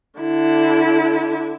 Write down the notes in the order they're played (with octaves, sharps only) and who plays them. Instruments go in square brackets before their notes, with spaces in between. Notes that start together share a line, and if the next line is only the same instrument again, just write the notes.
[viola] D3 E4